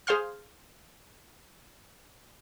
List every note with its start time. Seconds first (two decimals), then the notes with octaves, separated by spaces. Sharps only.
0.07 G#4 C5 F5 C6 F6